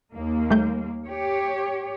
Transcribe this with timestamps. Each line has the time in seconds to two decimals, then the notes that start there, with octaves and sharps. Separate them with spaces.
0.13 D#2 A#3
0.50 G3 A3 G6
1.05 G4 C#5